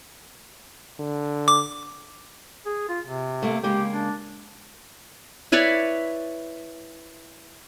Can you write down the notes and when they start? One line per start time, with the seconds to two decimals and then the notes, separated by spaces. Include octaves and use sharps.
0.99 D3
1.48 D6
2.66 G#4
2.89 F4
3.06 C3
3.42 A3 A#3
3.63 C#3 G#3 A#3 G4
3.91 D4
5.52 E4 B4 C#5 D5